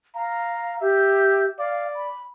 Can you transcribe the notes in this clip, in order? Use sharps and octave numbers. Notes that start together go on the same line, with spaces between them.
F5 A#5
G4 E5
D5 F5
B5